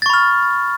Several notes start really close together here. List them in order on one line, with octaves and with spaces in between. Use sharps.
A6 C#6 B5 F6